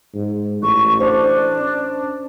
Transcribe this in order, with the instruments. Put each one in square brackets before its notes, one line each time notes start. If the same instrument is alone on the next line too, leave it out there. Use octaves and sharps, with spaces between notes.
[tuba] G#2
[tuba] A1 [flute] C#6
[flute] D4 [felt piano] C5
[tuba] C#4